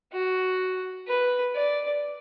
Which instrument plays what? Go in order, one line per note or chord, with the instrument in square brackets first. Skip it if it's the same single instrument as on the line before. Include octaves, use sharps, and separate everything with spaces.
[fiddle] F#4
B4
D5